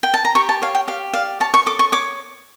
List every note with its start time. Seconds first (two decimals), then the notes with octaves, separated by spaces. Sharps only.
0.03 G5
0.14 A5
0.25 A#5
0.35 G4 C#6
0.49 A5
0.62 C#5 F5
0.75 G5
0.88 G4 F5
1.14 D5 F5
1.40 C#5 A5
1.54 C#6
1.66 A4 D6
1.79 C#6
1.92 C#5 D6